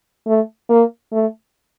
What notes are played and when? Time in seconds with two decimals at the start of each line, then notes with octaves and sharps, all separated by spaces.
0.27 A3
0.70 A#3
1.12 A3